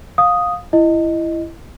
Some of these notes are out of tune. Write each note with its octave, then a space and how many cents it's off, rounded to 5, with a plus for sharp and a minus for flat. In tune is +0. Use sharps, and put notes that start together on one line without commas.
F5 +20 D#6 +0
E4 +15 D#5 +0